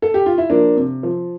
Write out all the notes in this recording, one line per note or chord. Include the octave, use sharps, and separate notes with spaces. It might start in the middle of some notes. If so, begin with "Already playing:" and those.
A4
G4
F4
E4
F3 A#3 D4
C3
F3